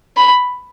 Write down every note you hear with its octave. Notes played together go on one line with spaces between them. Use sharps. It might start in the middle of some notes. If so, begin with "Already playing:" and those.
B5